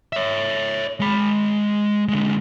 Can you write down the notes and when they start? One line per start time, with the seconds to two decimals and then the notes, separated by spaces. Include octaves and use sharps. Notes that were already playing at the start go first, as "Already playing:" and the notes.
0.13 C#5 E5
1.00 G#3 B5
2.09 D3 G#3